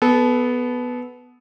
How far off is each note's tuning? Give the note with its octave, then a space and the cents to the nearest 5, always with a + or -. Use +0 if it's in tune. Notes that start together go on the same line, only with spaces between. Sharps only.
B3 +0 A4 -25